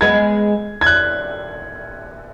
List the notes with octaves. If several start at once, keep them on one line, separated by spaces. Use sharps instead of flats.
G#3 B3 G#6
G#6
F#6